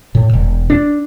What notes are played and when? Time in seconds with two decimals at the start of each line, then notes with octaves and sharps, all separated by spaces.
0.15 A2
0.33 E1
0.70 D4